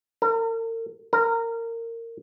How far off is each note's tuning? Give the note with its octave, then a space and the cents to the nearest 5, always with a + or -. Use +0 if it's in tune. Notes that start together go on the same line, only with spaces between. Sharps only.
A#4 -40
A#4 -20